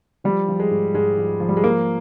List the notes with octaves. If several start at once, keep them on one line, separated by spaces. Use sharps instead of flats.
F3 G3
F3
G#3
G#2
G#2 G#3
F3
F3
G3
G#3
F3 A#3